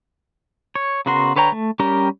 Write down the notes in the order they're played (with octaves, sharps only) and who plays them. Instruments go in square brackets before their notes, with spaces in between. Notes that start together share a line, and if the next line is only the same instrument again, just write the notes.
[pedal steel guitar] C#5
C#3 B3 F#4 A#4 C6
D3 B4 C#5 G5 A#5
A3
G3 C#4 G4 A#4 G5